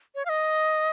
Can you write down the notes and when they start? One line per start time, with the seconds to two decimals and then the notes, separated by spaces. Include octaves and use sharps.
0.15 C#5
0.25 F5
0.29 D#5